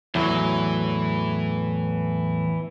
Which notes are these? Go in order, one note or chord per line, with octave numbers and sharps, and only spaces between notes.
E2 A2 E3 F#3